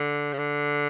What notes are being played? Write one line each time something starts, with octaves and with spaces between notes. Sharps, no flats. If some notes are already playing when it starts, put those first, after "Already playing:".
Already playing: D3
C#3
D3